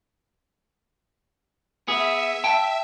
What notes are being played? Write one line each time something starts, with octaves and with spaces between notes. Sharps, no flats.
B3 G#4 E5
G5 A5